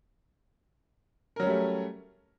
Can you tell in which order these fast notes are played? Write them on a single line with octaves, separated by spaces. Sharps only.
A#4 F#3 C#4 G3 A3